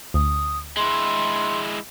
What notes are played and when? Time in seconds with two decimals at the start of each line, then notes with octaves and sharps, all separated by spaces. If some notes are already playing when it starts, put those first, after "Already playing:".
0.14 D2 D#6
0.77 G#3 E4 C6